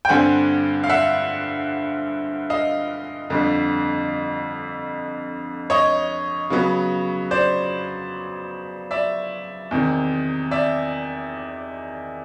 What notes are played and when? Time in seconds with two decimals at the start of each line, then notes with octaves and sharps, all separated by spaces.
0.05 G5
0.09 G2 D3 G3 C4 F#5 G#5
0.84 F5
0.89 E5 F#5
2.50 D#5 F5
3.30 F2 D3 G3
5.70 C#5 D#5
6.50 C#3 F#3 B3
7.31 C5 D5
8.91 D5 E5
9.71 E2 C3 D#3
10.51 D5 E5